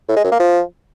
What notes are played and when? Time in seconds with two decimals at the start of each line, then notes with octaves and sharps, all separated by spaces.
0.09 A2
0.16 G#3
0.24 F#2
0.32 A#3
0.39 F3